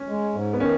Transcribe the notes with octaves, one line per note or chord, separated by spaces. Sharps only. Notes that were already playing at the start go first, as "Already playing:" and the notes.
Already playing: C#4
G#3
G#2
B3
D#3 C#4